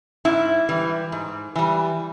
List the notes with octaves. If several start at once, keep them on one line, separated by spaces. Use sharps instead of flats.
G#2 E4
E3 G3
G#2
E3 G3